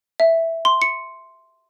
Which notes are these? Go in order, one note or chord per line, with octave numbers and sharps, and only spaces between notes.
E5
C6
C#7